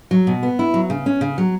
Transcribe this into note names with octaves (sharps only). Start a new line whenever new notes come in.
F#3
B2
B3
E4
F#3
C#3
C#4
C#3
F#3